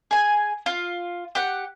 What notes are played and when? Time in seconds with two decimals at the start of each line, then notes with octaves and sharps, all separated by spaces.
0.11 G#4 G#5
0.66 F4
1.35 G4 F#5